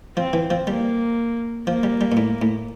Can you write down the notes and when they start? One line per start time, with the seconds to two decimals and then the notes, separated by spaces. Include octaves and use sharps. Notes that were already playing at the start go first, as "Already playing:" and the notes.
0.17 F3 C4
0.33 E3
0.50 F3
0.67 G3 A#3
1.67 F3 A#3
1.83 G3
2.01 G3
2.12 A#2
2.17 A2
2.42 A2